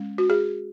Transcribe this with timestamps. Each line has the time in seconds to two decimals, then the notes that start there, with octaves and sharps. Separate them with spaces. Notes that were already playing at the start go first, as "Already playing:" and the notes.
Already playing: G#3 C#4
0.18 F#4
0.30 G#4